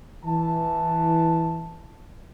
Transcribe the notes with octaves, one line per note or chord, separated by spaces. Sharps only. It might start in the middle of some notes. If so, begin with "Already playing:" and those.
E3 A5